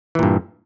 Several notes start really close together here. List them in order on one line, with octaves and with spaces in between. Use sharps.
E3 A#2 G2